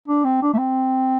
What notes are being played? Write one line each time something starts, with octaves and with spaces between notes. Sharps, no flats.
D4
C4
D4
A3
C4